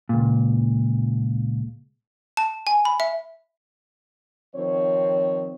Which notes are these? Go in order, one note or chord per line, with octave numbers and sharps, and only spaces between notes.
C#2 A#2
A5
G#5
B5
E5
D#3 F3 C4 C#5